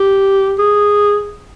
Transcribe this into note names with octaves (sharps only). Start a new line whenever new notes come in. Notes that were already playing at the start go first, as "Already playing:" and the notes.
Already playing: G4
G#4